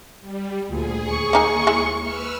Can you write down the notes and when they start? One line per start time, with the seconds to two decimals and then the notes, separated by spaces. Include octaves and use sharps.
0.20 G3
0.70 D2 A#2 G#4
1.03 D#2 C#6
1.33 A#3 D#4 G#5
1.67 G#3 E4
2.00 B4 E6 F6